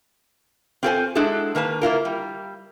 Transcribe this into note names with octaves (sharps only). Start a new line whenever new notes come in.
C4 F4 G#4 A4 C5 G#5
G#3 D4 E4 F#4 G#4 A4
D#3 A#3 B4 A5
A#3 E4 F4 A#4
G3